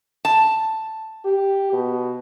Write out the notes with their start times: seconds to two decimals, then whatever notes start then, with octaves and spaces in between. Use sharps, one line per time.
0.25 A5
1.25 G4
1.73 B2